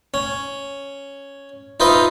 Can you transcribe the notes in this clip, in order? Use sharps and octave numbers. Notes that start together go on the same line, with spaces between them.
C#4
D#4 F4 B4 C5 D#5 E5